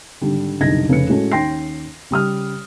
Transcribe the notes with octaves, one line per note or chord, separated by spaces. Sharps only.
G#1 D3 G3
F#1 C2 D3 D#4 G#6 A#6
F1 C#3 B4 C#7
A2 G#3 C#4 F#4 A4
D#2 C#4 G5 C6 A#6 C7
C#3 G3 D#6 F6